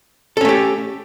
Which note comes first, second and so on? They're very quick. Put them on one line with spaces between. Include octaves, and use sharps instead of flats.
A4 C#4 A3 G4